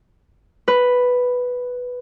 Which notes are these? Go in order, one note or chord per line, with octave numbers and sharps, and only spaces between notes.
B4